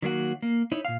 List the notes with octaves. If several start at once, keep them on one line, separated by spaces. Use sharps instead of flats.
D#3 F#3 A#3 F#4
A#3
D#4 E4 C#5
A#2 F5